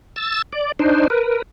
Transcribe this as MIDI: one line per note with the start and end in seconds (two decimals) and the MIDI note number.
0.16 0.42 88
0.16 0.42 93
0.53 0.72 74
0.79 1.08 62
0.79 1.08 63
0.79 1.08 72
1.10 1.42 70
1.10 1.42 71